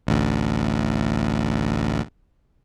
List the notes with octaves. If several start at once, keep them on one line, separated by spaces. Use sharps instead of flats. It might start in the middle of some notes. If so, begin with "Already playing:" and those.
A1 D2